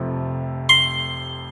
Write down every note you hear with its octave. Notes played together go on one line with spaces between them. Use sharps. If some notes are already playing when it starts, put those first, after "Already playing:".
Already playing: F1 F2 C3 F3 A3
C6